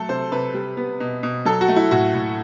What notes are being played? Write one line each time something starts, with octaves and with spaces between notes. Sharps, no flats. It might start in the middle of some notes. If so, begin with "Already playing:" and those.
Already playing: F#3 A3 A4
C3 C5
C3 B4
G3
B3
B2
B2
F#3 A4
F#4
A3
E4
A2 F#4
A2